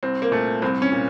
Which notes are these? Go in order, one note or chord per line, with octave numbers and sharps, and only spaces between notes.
C2 C4
A#3
A#2 A3
C2 C4
C#4
A#2